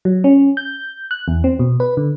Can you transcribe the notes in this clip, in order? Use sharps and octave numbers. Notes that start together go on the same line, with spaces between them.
F#3
C#4
G6
F#6
E2
C4
B2
B4
D3